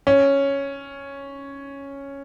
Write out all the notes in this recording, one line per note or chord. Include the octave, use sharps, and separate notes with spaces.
C#4